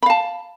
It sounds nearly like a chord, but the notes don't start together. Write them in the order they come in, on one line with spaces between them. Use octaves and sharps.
B5 F5 A5